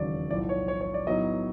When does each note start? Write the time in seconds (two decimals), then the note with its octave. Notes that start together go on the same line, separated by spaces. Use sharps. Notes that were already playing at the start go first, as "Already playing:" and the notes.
Already playing: E1 D#2 C#3 F#3 D5
0.30 B1 A2 F3 D5
0.49 C#5
0.68 C#5
0.81 C#5
0.94 D5
1.06 A2 F#3 B3 D#4 D#5